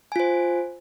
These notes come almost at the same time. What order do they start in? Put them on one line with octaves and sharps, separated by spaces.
G#5 F4 C5